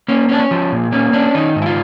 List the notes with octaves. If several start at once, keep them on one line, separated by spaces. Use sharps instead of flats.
A#3 C#4
C#4
D4
C#4
F3
A#2
A#3 C#4
C#4 D4
D#3 D#4
G#2
E4
F4